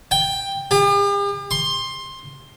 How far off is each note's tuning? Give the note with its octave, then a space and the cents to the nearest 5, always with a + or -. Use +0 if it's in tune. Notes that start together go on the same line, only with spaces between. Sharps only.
G5 +10
G4 +45
C6 +15